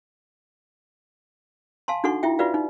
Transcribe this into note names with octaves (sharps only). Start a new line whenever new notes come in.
F5 G#5 A5 C6
D4 D#4 F#4 A4 F#5 C#6
E4 F4 E5 G5
F4 F#4 B4 D5 F5
D#4